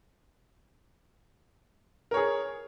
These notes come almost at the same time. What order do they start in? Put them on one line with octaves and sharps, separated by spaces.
A#4 C#5 G#4